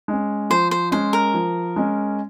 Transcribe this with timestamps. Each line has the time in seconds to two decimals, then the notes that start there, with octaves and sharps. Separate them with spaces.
0.08 G#3 C#4
0.50 F3 C5
0.71 C5
0.92 G#3 C#4 C5
1.13 A#4
1.34 F3
1.76 G#3 C#4